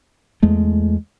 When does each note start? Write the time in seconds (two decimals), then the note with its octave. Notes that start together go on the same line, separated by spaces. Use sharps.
0.43 E2 G#3 A3